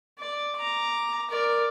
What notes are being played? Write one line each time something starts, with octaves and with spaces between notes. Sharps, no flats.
D5
A#5 D6
A#4 D5